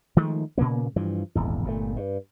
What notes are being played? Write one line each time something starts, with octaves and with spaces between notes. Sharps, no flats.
D#3 F3 G#3 A3
A#2 C#3 A#3 B3
G2 E3 F3
D#1 G#1 E2
G1 A#2 A3
G2